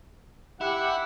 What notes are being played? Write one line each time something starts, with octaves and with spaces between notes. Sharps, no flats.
E4 G4 F#5